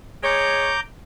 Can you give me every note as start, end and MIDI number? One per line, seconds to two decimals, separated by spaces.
0.23 0.73 56
0.23 0.73 73
0.23 0.80 82
0.23 0.80 86
0.23 0.80 91